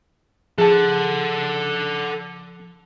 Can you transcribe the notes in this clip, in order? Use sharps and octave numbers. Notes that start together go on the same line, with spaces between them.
F3 G#4 A4 F#5 A5